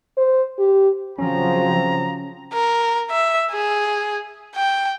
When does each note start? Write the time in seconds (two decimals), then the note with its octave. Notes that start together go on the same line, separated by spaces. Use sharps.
0.17 C5
0.58 G4
1.19 C#3 F3 F#3 C4 C#4 A#5
2.53 A#4
3.10 E5
3.51 G#4
4.56 G5